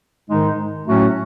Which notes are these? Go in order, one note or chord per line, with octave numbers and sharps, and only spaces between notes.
G#2 D#3 G#3 D#4
A2 F#3 A3 C#4 F#4